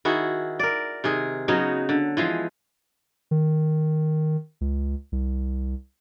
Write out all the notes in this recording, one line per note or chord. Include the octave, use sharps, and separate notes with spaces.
D#3 E4 F#4 G#4
A#4 D5
C3 D#3 G#4
C#3 F#3 B3 D#4
D3
E3 F3 G#3
D#3
C#2
C2